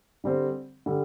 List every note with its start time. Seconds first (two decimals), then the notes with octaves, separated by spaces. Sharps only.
0.24 D3 G3 C4
0.86 D3 G3